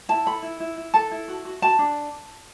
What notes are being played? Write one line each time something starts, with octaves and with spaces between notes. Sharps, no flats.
E4 A5
A4 B5
E4
E4
E4
A4 A5
E4
F#4
F#4
F#4 A5
D4